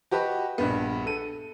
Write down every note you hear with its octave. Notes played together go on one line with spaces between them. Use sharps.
F#4 G4 B4 D#5 A5
A#1 G2 B3
A4 D#7